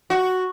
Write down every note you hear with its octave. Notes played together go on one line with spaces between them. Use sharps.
F#4